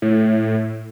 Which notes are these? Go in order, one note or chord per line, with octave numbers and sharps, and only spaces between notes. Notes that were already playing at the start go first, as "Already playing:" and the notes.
A2